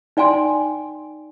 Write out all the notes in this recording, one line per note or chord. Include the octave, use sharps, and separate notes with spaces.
D#4 D5 G5 G#5 C6